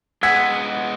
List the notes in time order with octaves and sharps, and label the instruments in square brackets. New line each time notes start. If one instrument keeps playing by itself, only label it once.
[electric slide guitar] G#3 B3 G#4 [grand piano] F#5 [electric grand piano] E6 G#6 B6